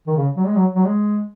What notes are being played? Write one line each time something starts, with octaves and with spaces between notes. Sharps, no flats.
D#3
C#3
F#3
G#3
F#3
F#3
G#3